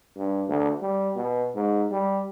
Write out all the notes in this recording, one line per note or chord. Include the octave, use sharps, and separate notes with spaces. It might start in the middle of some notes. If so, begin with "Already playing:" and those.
G2
D2
G3
B2
G#2
G3